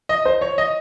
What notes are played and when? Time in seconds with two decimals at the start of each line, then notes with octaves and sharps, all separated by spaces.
0.09 D#5
0.25 C5
0.41 C#5
0.58 D#5